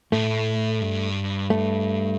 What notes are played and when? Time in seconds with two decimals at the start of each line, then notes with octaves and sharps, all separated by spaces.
0.12 A2 A3
0.81 G2
1.50 A3